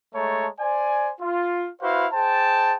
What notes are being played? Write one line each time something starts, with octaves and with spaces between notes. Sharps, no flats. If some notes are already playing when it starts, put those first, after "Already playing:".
G#3 A3 C#5 A5 A#5
C5 D5 G#5
F4
E4 F#4 B4 C5 F5
G#4 C5 G5 A5